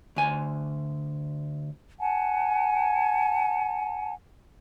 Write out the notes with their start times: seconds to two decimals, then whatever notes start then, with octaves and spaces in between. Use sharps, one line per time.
0.16 D2 G#5
1.99 F#5 G#5 A5